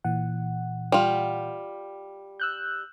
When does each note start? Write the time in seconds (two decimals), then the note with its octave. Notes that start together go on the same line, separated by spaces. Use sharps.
0.04 A#2 E3 F#5
0.92 G3 F4
2.40 E6 F#6 G6